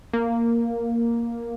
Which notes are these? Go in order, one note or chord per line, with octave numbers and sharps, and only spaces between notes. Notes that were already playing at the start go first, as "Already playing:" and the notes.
A#3